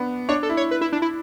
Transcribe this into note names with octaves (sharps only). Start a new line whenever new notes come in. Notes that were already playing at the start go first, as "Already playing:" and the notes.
Already playing: B3 D4
D4 C#5
A4
E4
C#5
B4
E4
D4
E4